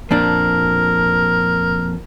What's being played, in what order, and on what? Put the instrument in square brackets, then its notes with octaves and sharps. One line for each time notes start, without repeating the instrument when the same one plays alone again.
[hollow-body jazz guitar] F2 A#2 D4 [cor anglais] A#4